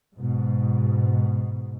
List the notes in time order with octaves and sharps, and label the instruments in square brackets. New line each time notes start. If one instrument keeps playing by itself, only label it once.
[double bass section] G#2 B2